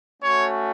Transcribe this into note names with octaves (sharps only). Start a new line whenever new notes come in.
A3 C#4 F#4 C#5